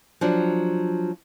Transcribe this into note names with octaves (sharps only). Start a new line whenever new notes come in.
F3 F#3 D4